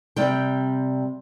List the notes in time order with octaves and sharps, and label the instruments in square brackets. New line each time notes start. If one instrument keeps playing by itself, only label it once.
[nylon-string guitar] C3 G3 G5